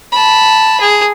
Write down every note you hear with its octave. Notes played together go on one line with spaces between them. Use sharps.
A5 B5
G#4